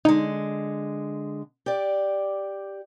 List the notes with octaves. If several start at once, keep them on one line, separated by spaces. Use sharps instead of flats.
D3 G#3 D#4
G4 D5